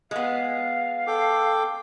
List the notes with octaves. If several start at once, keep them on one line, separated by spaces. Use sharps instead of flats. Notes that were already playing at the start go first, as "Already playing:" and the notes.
G#3 B3 F5
A4 G5 D6